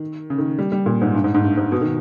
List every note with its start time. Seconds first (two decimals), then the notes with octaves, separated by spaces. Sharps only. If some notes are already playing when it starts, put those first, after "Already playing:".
Already playing: D#3
0.30 C#3
0.38 D#3
0.59 G3
0.72 G3
0.86 A#2
1.01 G#2
1.14 G2
1.24 G#2
1.34 G#2
1.44 G2
1.57 G#2
1.72 B2
1.81 D#3